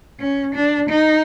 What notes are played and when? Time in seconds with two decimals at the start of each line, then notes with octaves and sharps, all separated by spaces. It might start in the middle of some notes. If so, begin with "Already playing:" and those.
0.20 C#4
0.55 D4
0.90 D#4